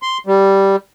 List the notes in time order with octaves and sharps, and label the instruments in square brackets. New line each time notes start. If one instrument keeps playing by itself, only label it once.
[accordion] C6
G3